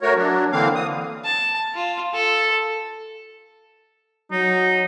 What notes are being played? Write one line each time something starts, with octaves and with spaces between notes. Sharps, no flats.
A3 F#4 A#4 C#5
F#3 D4
D3 E3 A#3 C4 F5
D#6
A5
F4
A4
F#3 D#4